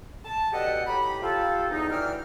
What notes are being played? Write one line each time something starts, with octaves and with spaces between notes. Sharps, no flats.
A5
B2 G4 A4 D5 D#5 F#5
A2 G4 A#5 B5
F4 G4 A4
E2 D#4
E3 F#3 D4 A4 G5 F6